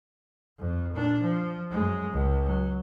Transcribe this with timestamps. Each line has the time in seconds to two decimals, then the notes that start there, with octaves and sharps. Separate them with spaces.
0.58 F2
0.93 A#2 D4
1.22 F3
1.71 F#2 G#3
2.11 C#2
2.46 F#3